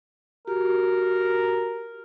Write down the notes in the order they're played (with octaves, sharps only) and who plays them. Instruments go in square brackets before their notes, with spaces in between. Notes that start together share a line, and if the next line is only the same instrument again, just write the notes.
[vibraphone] F#4 G4 [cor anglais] A#4